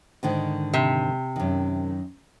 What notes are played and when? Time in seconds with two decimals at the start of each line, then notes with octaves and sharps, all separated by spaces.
0.23 G#2 D3 D#3
0.74 C3
1.36 F#2 D#3